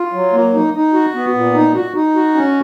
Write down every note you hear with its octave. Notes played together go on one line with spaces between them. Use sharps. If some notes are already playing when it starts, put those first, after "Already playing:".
Already playing: F4
F#3
A#3
D#4
D#4
F#4
B3
A#2
D#4
F#4
D#4
F#4
C#4